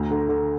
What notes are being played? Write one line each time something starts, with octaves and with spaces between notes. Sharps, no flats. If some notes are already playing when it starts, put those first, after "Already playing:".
Already playing: D2 A#5
D3
D3